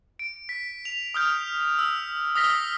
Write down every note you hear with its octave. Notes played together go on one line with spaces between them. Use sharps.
D7
B6
F7
D#6 F6 G6
E6
D#6 F6 A#6 B6 G7